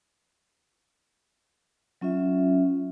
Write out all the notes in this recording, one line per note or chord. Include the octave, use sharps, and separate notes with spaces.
F#3 C#4 F4 E5